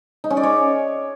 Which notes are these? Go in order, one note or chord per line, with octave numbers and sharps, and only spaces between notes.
D#4
C#4
D5
C#5